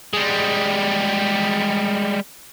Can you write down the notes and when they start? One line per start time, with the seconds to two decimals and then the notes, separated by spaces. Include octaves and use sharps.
0.13 G3 G#3